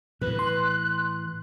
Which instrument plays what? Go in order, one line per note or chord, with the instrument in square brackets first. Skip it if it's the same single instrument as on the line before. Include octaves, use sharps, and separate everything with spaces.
[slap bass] A2 E3 [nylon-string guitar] B4 [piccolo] F#6
[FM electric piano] C6